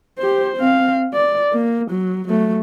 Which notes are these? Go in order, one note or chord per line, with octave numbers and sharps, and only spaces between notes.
G4 C5
C4 F5
D5
A#3
F#3
F#3 A3